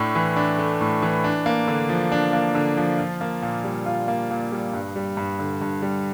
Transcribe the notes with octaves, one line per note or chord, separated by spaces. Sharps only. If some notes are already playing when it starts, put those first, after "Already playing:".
Already playing: A2 A3 D4
E3
D4
A3
A2
E3
D4
A#3
D3
F3
D4
A#3
D3
F3
F4
A#3
A#2
G3
F4
A#3
A#2
G3
G2
G3
G2
D3
G2
G3